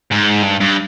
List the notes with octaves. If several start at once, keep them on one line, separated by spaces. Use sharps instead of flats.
G#2
G2
G2